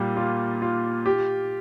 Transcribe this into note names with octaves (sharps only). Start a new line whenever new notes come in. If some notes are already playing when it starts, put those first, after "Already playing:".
Already playing: A#2 G3
F4
F4
G4